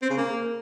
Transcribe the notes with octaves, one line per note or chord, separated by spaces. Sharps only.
C4
C#3
A#3